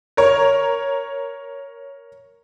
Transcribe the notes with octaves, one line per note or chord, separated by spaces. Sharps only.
A#4 C#5